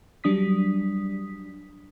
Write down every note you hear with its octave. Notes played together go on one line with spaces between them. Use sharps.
F#3 G3 D4 D#6 B6